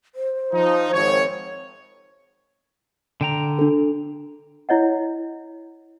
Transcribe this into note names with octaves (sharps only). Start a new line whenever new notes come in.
C5
F3 D#4
G#1 C#5
D3 G5 A#5
D4 A4
E4 C#5 D#5 F#5